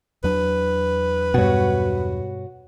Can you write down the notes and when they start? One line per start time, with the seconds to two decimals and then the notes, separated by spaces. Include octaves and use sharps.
0.24 E2 F#3 D4 B4
1.34 G2 B2 F#4 C#5